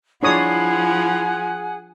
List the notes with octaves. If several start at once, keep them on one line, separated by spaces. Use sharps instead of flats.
F3 D4 E4 G#4 C#5 F#5 G#5 D#6